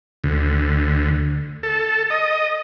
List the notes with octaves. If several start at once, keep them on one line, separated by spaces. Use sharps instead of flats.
D2
A4
D#5